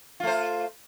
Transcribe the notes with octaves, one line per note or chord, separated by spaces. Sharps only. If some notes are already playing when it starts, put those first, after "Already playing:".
A3 F4 C5